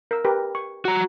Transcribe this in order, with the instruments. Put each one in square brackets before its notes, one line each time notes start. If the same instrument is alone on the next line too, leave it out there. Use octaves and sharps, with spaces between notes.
[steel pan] A#4 E6
G4 A#4 B4
C#6
[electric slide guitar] F#4 A#5